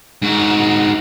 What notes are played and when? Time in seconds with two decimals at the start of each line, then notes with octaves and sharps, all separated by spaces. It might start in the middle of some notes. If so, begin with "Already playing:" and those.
0.22 G#2 F#4